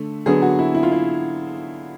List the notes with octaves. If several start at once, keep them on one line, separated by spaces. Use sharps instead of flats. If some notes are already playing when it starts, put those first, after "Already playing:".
Already playing: D3 A3
D3 F#3 B3 G#4
F#4
E4
E4
F4
E4